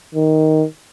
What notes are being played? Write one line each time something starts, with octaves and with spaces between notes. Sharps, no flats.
D#3